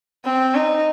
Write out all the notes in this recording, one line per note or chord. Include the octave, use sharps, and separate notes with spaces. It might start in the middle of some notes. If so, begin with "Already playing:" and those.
C4
D#4